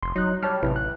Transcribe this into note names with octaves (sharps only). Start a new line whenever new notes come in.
F1 C6
F#3 D#4 F#6
G3 C#5 A5 F6
A1 C3 E4 B4
F#6